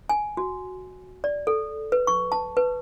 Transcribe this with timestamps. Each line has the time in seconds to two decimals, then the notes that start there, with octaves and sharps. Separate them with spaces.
0.09 G#5
0.37 F#4
1.24 D5
1.47 A4
1.92 B4
2.07 C#6
2.32 A5
2.57 B4